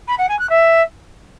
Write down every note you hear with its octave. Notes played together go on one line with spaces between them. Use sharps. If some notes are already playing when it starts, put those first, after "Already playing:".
B5
F#5
G#5
F#6
E5